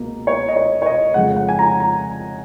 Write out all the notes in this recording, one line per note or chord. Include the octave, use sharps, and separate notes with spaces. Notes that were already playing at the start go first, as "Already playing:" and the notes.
Already playing: C#2 B2 A#3
C#5
D#5
C#5
C#5
D#5
F2 C#3 G#3 F#5
F#5
G#5
A#5
A#5